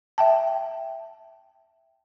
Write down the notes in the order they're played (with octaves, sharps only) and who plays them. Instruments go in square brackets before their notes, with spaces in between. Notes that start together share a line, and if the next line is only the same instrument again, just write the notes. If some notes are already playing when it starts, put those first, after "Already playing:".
[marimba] E5 G5 A5